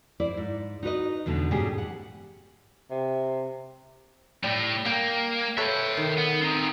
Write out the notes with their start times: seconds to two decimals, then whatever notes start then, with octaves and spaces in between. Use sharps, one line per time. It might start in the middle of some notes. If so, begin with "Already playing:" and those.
0.20 E4 C5 D5
0.37 G#2
0.83 D#4 F#4 B4 D#5
1.26 E2 B2 D3 A3 D#4
1.51 G#2 B2 G3 C#4 G4 G#4
1.78 F#5
2.91 C3
4.44 A2 G3
4.86 A#3 G5
5.57 A4 B4 C#5 E5 G5
5.97 D#3
6.18 B3
6.42 C4 D#4